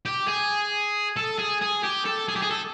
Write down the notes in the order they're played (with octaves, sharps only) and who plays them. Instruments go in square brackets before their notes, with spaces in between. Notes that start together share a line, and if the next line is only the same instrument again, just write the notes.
[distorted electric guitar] G4
G#4
A4
G#4
G#4
G4
A4
G#4
G4
G#4
A4